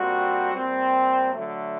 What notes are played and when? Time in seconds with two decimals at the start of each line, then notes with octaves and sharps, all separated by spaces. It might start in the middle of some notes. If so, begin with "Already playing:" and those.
Already playing: A#2 G3 C4 F#4
0.54 A#2 G3 C4
1.32 D3 F#3 A3